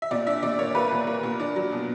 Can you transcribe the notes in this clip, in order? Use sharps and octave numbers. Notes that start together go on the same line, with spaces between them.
E5
A#2 D5
D4 E5
A#2 D5
A#3 C#5
A#3 B4
A#2
A#3
A#2
D4
F#3
B2